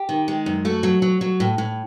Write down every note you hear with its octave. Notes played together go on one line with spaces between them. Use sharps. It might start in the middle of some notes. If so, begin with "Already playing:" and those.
Already playing: G4
D#3
G#3
F#2
A3 F#4
F#3
F#3
F#3
A2
A2